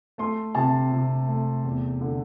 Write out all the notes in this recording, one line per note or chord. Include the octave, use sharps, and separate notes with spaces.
A3 C6
C3 A5
C3
A3
E2
D3